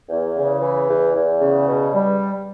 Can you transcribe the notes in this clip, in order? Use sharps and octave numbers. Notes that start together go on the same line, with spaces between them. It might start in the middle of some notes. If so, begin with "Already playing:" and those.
E2
C#3
E3
E2
E2
C#3
B2
G3